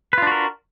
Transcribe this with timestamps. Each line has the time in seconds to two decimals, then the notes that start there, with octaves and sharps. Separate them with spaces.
0.13 B4
0.18 F4
0.22 D4
0.27 F#4
0.32 A#4